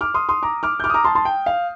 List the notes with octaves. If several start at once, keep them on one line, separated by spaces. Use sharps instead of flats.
D6 F6
C6 D#6
C6 D#6
A#5 D6
D6 F6
G6
D6 F6
D#6
A#5 D6
A5 C6
A5 C6
G5
F5